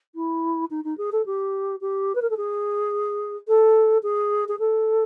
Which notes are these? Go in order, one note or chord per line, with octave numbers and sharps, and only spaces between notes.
E4
D#4
D#4
G#4
A4
G4
G4
B4
A#4
A4
G#4
A4
G#4
G#4
A4